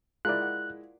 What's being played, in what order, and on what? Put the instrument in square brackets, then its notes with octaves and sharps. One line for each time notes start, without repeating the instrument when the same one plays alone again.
[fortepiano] G#3 E4 [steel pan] F4 A#4 D5 [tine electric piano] F#6
[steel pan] F#5